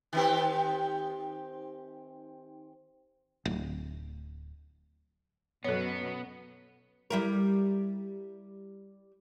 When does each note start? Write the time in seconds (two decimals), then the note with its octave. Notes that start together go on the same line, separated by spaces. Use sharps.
0.13 D#3 C4 G4
3.45 D1
5.65 F#2 B2 F#3 B3 A4 C#5
7.10 G3 E4 A#4